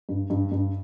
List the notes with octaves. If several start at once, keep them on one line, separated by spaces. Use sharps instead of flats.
G2
G2
G2